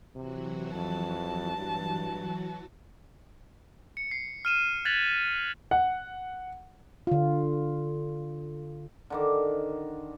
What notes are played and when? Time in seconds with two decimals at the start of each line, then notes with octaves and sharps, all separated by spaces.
0.15 C3 E3 F#3 F#4
0.74 F2 A5
1.56 G2
3.97 C#7
4.11 C7
4.45 F6 D#7 E7
4.85 F#6 G#6 A6 B6 F7 F#7
5.71 F#5
7.07 D3 F4
9.10 D3 D#3 D6